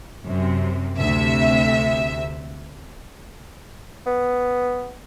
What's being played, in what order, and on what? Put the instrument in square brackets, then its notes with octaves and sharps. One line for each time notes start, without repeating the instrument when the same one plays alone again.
[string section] F#2 C3
D2 C3 E5
[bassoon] B3